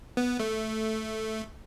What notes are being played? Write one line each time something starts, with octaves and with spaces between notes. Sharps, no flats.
B3
A3